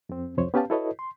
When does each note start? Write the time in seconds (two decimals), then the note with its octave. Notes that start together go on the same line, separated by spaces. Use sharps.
0.09 F2 C4
0.37 C2 F2 C5 C#5
0.54 B3 C#4 G4 B4 F5 A5
0.70 E4 F#4 A4 B4 C#5 D#5
0.99 C6